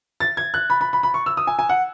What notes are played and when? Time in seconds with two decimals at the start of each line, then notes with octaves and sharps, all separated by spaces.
0.20 A6
0.37 G#6
0.54 F#6
0.70 B5
0.81 B5
0.93 B5
1.03 B5
1.14 C#6
1.26 E6
1.37 D#6
1.47 G#5
1.59 G#5
1.69 F#5